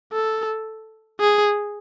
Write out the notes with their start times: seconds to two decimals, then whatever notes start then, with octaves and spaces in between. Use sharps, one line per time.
0.13 A4
1.21 G#4